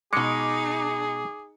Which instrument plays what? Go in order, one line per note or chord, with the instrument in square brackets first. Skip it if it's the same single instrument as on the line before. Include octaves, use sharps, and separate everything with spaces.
[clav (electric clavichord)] B2 G#3 [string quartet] D#4 [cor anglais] G#4 [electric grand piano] D6 C#7